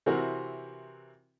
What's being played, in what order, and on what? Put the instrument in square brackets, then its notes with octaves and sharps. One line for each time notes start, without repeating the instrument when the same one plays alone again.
[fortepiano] C3 E3 C4 F#4 A#4